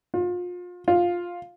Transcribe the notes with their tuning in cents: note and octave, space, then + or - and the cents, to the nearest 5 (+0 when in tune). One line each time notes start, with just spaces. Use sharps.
F4 +30
F4 +5